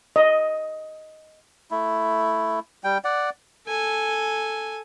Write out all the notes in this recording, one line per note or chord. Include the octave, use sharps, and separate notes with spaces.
D#5
A3 E4
G3 G5
D5 F#5
A4 G#5